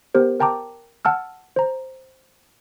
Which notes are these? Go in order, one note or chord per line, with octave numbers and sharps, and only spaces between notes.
B3 G4 A#4 C5
A#4 G5 A5 A#5 D6
F#5 A5 E6 F6
C5 A#5